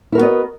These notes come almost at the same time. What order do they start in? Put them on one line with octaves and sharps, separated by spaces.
E4 A#4 F#4 B3 D#5